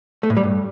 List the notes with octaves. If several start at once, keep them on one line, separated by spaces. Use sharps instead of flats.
A3
A2
G3
G2